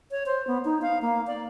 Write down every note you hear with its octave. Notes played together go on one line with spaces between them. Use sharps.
C#5
C5
B3
D#4
F5
A#3
D5